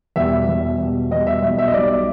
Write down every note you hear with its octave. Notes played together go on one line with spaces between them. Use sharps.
E2 B2 G3 E5
E2 B2 G3
E2 B2 G3
E2 B2 G3 D#5
E5
B1 B2 G3 E5
E5
D#5
B1 B2 G3 D5